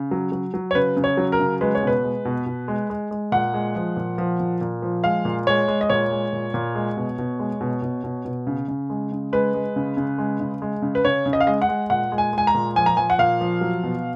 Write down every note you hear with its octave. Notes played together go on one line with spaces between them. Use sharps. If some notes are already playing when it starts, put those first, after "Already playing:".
Already playing: C#3
F#3
F#3
F#3
C#5
C#3 B4
C#3
C#5
F#3
A#4
C#3
G#3 B4
C#5
B2 B4
G#3
B2
B2
G#3
G#3
G#3
A#2 F#5
G#3
F3
A#2
F3
A#2
A#2
F3
G#3 F5
A#2
G#3 C#5
G#3
D#5
A#2 C#5
G#3
A#2
A#2
G#3
B2
B2
G#3
B2
B2
B2
B2
C#3
C#3
G#3
C#3
G#3 B4
G#3
C#3
C#3
G#3
C#3
G#3
C#3
B4
C#3 C#5
C#3
D#5
F5
G#3 D#5
F#5
G#3
A#2 F#5
G#3
G#5
G#3 G#5
A#5
A#2
F3 G#5
A#5
F3 G#5
F#5
A#2 F5
F3
F#3
B2